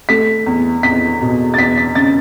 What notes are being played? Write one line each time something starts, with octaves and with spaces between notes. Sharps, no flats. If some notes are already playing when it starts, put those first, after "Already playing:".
A3 B6
E2
E2 B6
B2
A6
E2 B6
B6
C#3 A6